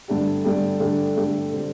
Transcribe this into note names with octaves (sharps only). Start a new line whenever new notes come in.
G2 D3 A3 D4 G4
G2 D3 A3 D4 G4
G2 D3 A3 D4 G4
G2 D3 A3 D4 G4
D3 G3 C4 G4